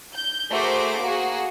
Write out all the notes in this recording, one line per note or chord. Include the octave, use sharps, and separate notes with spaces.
G6
A3 F#4 G#4 A#4 C5 D6
A#3 F#4 G#4